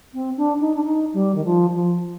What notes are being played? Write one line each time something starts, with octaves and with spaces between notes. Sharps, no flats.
C4
D4
D#4
D4
D#4
G3
D#3
F3
F3